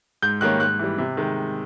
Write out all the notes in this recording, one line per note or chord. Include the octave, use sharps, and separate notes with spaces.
G#2 G6
D#3 G3 A#3 C#4 F#6
G#2 F#6
E3 G3
C3
D#3 G#3